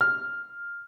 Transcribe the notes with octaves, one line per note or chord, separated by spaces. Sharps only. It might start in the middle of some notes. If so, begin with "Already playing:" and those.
F6